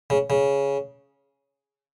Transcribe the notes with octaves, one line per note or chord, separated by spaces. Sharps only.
C#3
C#3